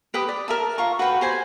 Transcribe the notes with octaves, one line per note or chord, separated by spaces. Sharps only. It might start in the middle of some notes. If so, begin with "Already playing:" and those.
G4 B4 G5 D#6
D5
A#4 E5 A5
F4 A#5 C#6
F#4 B4 G5
G4 C5 G#5